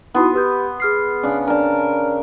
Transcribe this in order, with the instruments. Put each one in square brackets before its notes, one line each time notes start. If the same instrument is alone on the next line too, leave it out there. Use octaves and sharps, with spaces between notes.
[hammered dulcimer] B3 C6 [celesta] D#4 E4 F#4
[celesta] G4 B4 G6
G#4 F6 C7
[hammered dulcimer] C#3 D4
[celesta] D4 D5 [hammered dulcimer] A#4 A5